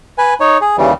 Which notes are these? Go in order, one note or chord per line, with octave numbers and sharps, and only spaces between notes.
B4 G#5
D#4 C#5
G#4
D#2 C#3 E3 G3